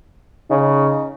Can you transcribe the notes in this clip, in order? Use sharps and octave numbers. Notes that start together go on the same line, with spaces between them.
C#3 D#4